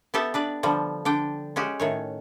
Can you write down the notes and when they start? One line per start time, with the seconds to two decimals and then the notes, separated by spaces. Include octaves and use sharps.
0.14 B3 G4 A4 E5 G5
0.34 D4 B4 D5
0.63 D3 F3 G3
1.05 D3 D4 G5
1.56 G#3 C#4 F#4 G4
1.80 A2 D#3 C#5